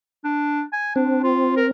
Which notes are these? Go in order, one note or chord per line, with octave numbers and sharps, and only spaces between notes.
D4
G#5
C4 D4
F4
A#4